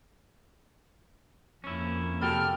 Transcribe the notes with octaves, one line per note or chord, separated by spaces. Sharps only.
F2 A#3 C#4 E4
C3 F#4 G4 A4 G5 B5 F6